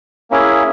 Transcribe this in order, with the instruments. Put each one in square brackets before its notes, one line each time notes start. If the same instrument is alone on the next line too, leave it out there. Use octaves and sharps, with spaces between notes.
[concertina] A#3 C#4 E4 G#4